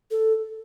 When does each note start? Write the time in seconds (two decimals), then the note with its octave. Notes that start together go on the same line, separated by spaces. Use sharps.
0.11 A4